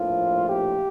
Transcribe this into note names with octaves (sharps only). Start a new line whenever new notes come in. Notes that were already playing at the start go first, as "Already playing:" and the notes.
Already playing: A#1 A2 F3 F4
G4